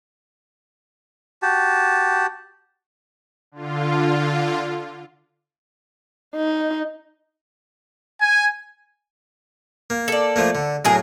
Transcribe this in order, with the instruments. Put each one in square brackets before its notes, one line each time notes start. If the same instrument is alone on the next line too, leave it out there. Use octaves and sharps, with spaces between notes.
[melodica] F#4 G4 A5
[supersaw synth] D3 F4
[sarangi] D#4
[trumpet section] G#5
[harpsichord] A#3
[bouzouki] A4 D5
[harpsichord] F3 A3 A#3
D3
[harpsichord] A2 F#3 [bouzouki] G#4 A#4